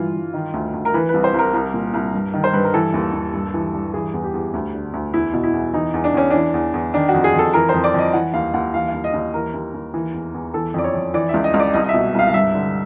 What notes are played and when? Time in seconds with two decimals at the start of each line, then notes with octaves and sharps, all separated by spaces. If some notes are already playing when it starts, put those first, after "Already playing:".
Already playing: G2 E3 F4
0.14 G2
0.34 D#3
0.54 D2
0.74 D2
0.85 A#4
0.94 E3 B4
1.09 B4
1.14 C2
1.24 C5
1.34 C2
1.39 A#4
1.54 C2
1.74 A#2
1.94 C2
2.14 G2
2.34 D#3
2.44 C5
2.54 G2 B4
2.64 A#4
2.74 E3 A4
2.94 D#2
3.13 D#2
3.34 G2
3.54 E3
3.74 G2
3.94 E3 G#4
4.14 E2
4.24 G4
4.34 E2
4.54 D2
4.74 D3
4.94 D2
5.14 E2 E4
5.33 B2
5.43 E4
5.54 E2
5.74 E3 D#4
5.94 E2
6.04 D4
6.14 E2 C#4
6.30 E3 D4
6.54 E2
6.74 E2
6.94 D#3 D4
7.09 F#4
7.14 F2
7.24 G#4
7.34 F2 A4
7.54 E3 A#4
7.69 F2 C5
7.84 D5
7.94 F2 D#5
8.13 E3 F#5
8.34 D#2 F5
8.54 D#2 F#5
8.74 E3 F5
8.89 F5
8.94 D#2
9.04 D#5
9.14 D#2
9.19 D#5
9.34 E3 A#4
9.54 D#2
9.74 D#2
9.94 E3
10.14 E2
10.34 E2
10.54 E3 A4
10.74 F2 D5
10.84 C#5
10.94 F2
11.14 E3 D5
11.29 E5
11.34 C#2
11.44 D#5
11.54 C#2
11.60 D5
11.74 C2 D#5
11.84 D#5
11.89 E5
11.94 B2
12.14 C2 F5
12.28 F5
12.33 G2 E5
12.54 D3